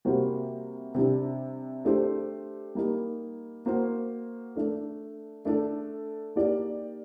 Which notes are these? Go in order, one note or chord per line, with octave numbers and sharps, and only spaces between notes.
C3 G3 A#3 F#4 C5
C3 G3 D4
A3 D4 G4 C5
G3 A#3 D#4
A#3 F#4 C5
A3 D4 A4
A3 D4 A4
A#3 D#4 G4 A#4 D5